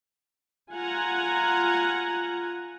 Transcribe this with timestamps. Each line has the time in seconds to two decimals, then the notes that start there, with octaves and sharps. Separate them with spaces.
0.72 F4 F#5 G#5 A#5